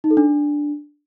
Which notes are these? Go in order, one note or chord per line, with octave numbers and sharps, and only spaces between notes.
D#4
A4
D4